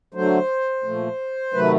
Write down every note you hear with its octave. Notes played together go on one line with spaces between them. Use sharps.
D3 F#3 A3 C5
A#2 F3 A3
C3 D#3 F#3 A3 B4